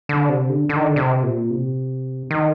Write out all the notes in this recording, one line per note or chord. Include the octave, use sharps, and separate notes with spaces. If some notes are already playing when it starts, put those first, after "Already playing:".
D3
C3
D3
D3
D#3
D3
C3
A#2
C3
D#3